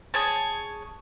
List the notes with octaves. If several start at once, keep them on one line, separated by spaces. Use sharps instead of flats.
G#4 C#5 G#5 A5